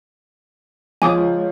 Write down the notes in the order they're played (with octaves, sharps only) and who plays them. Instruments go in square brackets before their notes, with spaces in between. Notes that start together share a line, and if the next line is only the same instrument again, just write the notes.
[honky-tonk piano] F3 [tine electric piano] G#3 F4 C#5 [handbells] G#5 D6 D#6